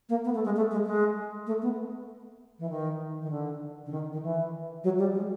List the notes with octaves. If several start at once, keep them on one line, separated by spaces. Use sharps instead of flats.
A#3
B3
A3
G#3
A3
G#3
G#3
A3
B3
E3
D#3
D#3
D3
D3
D#3
D#3
E3
F#3
G3
G#3